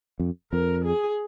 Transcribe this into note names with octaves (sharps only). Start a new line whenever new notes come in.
F2
F2 A#4
G#4